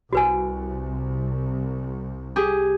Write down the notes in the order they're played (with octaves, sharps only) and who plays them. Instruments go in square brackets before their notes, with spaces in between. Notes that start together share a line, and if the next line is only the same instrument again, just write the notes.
[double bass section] C2 [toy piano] F#4 B4 G#5
[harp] G4 G#4